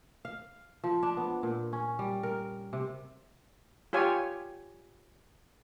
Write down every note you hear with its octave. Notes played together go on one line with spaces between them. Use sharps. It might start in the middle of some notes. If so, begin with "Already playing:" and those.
F5
F3
D4
B3
A#2
C#4
G3
A#4
C3
F4 G4 C#5 G#5